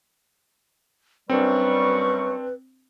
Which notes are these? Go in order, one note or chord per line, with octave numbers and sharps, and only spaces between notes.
F#2 G3 C4 D4 B4 C#6